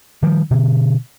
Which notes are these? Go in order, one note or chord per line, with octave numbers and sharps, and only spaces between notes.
D#3 F3 G3
B2 D3